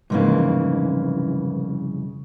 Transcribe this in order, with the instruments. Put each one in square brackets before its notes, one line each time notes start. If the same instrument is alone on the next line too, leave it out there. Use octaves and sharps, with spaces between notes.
[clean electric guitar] C2 F2 C#3 [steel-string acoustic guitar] G#2 E3 A#3